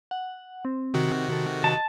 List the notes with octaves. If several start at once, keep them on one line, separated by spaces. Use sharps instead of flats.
F#5
C4
C3 D#3 F#4
A4
D#5 A5